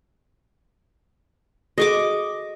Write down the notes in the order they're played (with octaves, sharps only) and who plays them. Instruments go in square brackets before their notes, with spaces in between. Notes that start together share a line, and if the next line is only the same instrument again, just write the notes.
[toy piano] F#4 G#4 A4 [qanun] D#5 C#6 D6